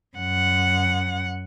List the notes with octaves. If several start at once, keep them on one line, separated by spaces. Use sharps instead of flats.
F#2 F#5